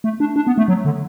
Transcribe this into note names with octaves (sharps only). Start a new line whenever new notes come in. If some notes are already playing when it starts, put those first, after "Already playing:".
A3
D4
D4
B3
A3
F#3
D3